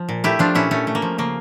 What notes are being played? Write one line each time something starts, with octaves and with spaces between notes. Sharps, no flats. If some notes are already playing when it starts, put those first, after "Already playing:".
Already playing: F3
A#2
A3 E4 G4
F3 D4 F4
A#2 C#4 E4
A#2 A3 C#4
A3
A#3
F3
C#3 A#3